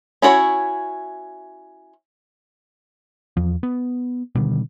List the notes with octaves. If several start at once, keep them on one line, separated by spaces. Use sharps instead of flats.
C#4 E4 F#4 C#5
E2 F3
B3
B2 D3 D#3 G3